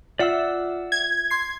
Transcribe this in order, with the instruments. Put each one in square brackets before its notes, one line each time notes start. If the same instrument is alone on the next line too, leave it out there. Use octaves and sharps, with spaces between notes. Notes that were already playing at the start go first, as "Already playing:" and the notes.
[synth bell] F4 E5 [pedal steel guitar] D5 F#5 E6
[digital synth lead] G#6
[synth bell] C6 C7